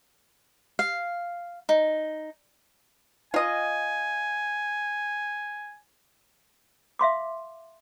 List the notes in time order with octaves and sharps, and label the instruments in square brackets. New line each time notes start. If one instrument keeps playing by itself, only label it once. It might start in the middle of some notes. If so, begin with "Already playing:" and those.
[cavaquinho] F5
D#4
[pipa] F4 D#5 [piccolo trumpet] G#5
[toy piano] E5 F5 C6 D6